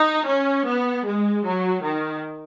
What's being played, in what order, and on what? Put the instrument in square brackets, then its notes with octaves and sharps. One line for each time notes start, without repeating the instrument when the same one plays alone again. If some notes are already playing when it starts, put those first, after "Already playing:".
Already playing: [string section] D#4
C#4
B3
G#3
F#3
D#3